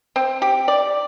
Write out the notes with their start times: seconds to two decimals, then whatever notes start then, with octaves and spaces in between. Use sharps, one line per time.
0.16 C4
0.42 G4
0.68 D5